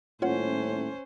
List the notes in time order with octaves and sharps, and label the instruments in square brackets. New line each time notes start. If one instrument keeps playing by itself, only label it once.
[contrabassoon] D#1 [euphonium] A2 [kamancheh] C#4 C5 [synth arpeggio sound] F4 C#5 F#5